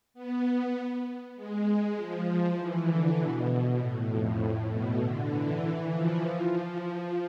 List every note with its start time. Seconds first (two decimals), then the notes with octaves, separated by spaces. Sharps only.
0.14 B3
1.36 G#3
1.96 F3
2.56 E3
2.86 D3
3.17 B2
3.78 A2
4.08 F2
4.38 A2
4.69 B2
4.99 D3
5.30 E3
5.90 F3
6.82 F3